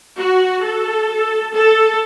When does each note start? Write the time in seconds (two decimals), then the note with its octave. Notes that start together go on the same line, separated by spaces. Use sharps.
0.18 F#4
0.63 A4
1.54 A4